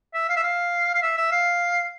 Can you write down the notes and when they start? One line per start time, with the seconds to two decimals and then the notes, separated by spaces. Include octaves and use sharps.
0.14 E5
0.29 F5
0.36 E5
0.43 F5
0.95 F5
1.02 E5
1.18 E5
1.32 F5